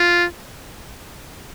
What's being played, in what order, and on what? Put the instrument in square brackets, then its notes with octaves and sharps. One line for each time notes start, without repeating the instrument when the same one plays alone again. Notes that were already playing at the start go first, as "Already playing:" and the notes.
Already playing: [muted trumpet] F4